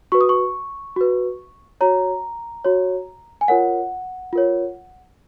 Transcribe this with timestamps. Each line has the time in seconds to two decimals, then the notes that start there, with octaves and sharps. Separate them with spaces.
0.12 F#4 B4 C#6
0.21 D#6
0.29 C#6
0.96 F#4 B4
1.81 F#4 C#5 A#5
2.64 F#4 C#5
3.41 G#5
3.48 F4 A#4 C#5 F#5
4.33 F4 A#4 C#5